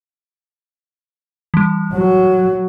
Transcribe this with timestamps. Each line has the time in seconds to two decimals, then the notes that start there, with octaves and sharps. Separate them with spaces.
1.54 E3 G3
1.93 F#3